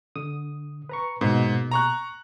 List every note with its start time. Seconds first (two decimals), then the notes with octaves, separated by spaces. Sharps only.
0.16 D3 D#6
0.89 B4 A#5 C#6
1.21 G#2 B2 A#3
1.71 A#5 C#6 F#6